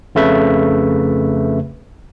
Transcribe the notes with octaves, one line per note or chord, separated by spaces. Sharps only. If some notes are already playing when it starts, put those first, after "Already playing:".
F2 C#3 A3 B4 E5